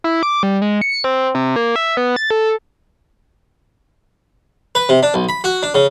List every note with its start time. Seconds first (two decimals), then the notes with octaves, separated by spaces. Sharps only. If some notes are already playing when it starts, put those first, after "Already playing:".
0.04 E4
0.23 D6
0.43 G3
0.62 G#3
0.81 C#7
1.04 C4
1.35 C3
1.56 A#3
1.76 E5
1.97 B3
2.16 A6
2.31 A4
4.75 B4
4.89 C3
5.03 D4
5.14 B1
5.29 B5
5.44 F#4
5.63 D4
5.74 C#3